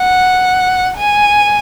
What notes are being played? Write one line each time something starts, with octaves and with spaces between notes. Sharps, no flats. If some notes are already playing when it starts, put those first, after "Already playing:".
Already playing: F#5
G#5